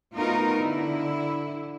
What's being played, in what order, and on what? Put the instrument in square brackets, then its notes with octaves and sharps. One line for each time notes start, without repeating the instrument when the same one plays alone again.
[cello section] A3 B3 D#4 F4 F#4 A#4
D3 E4